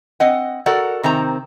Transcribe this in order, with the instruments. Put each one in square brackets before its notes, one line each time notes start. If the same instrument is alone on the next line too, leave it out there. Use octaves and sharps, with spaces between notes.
[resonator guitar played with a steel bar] C4 D#5 F#5
F#4 A4 A#4 D5 F#5
C3 D#3 C4 A#5